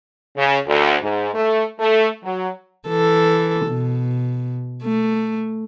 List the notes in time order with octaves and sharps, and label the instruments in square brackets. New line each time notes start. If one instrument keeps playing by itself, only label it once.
[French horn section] C#3
D2
G#2
A3
A3
F#3
[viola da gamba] E3 A4
B2
A3